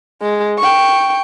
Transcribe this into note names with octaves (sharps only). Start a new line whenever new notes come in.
G#3
G5 C#6